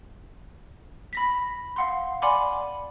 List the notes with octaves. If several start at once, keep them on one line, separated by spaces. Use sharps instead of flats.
B5 A#6 B6
F5 F#5 C6
D5 F#5 G#5 B5 C6 D6